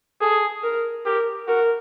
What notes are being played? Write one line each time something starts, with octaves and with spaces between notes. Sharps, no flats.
G#4 A4
A#4
G4 A#4
F#4 A#4